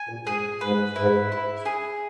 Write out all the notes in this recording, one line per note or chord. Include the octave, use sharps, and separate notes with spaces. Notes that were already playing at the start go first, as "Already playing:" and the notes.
Already playing: G#5
A#2
G#2 G#4
G#2 B4
G#2 E4
E4
G#4